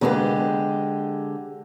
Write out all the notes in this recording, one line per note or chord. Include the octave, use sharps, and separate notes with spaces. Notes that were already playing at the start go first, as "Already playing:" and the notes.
D3 G#3 A#3 B3 G4 G#4